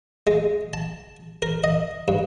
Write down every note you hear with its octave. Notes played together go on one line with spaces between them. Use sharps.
G#3
A5
A#4
D#5
G2